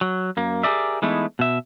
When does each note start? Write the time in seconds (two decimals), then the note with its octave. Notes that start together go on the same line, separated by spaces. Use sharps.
0.01 F#3
0.37 F#2 A#3
0.63 G4 G#4 A#4 D5 E5
1.02 E3 G#3 A3 B3 D#4 E4
1.39 B2 E5